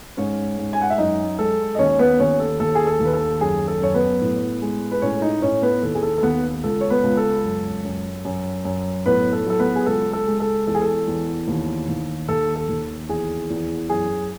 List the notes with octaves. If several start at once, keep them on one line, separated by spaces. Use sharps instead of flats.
G#2 C#4 C#5
G#2
G#5
F#5
E5
F#2 D#4 D#5
G#3 A4
D#5
D#2 C#4 C#5
B3 B4
D#2 C#4 C#5
A4
D#2 A4
G#4
A4
D#2
B4
A4
F#2 G#4
A4
F#2 C#5
B3 B4
A2
G#3
B4
A2 C#4 C#5
D#4 D#5
A2 C#4 C#5
B3 B4
D#2 A4
G#4
A4
A4
D#2 B3 B4
C#2 A4
C#5
B3 B4
C#2
A4
F#2
F#2
F#2
F#2
A2 B3 B4
A4
F#3 A4
B3 B4
G#4
C#2 A4
A4
G#3
A4
E2 A4
G#4
A4
E2
D#2
D#2
D#2 A4
A4
D#2
E2 G#4
E2
F#2 G#4